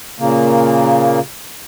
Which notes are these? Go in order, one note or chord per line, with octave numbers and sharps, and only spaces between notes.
A#2 C#3 A#3